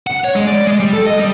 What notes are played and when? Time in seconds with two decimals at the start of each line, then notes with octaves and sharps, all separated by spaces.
0.07 F#5
0.24 C#5
0.36 G#3
0.47 D5
0.67 G#3
0.80 G3
0.93 A4
1.06 D#5
1.20 G3